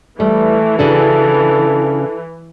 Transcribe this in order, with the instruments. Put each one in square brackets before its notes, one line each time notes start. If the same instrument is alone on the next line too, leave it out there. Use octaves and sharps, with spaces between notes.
[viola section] E3 [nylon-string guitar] G3 [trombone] A3
[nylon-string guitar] C#3 D4 F#4 [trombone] A4